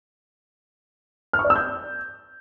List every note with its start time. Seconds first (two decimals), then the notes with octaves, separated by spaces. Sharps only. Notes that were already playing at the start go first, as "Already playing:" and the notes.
1.33 F6
1.39 C#6
1.45 D5
1.50 E6
1.56 G6